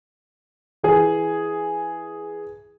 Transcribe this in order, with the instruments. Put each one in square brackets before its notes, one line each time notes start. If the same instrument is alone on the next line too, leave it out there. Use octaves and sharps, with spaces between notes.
[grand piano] E3 G#4